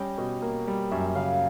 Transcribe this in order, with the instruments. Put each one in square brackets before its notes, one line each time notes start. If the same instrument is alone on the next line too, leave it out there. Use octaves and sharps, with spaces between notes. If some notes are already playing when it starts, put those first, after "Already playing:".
Already playing: [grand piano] G3 C#4 [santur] D#5 G5
[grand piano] B2
A#3
G3
[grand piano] F#2 [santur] E5
[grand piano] C#3 [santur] F5